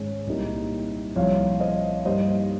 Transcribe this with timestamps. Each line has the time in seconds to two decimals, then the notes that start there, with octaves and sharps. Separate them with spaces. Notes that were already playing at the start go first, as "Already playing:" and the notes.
Already playing: G#2 D#3 G#3 C#4
0.27 C2 A#2 G3 A#3 D#4
1.16 C2 A#2 F3 C#5 F5
1.60 C5 D#5
2.05 G2 G3 A#3 D#4 C5 D#5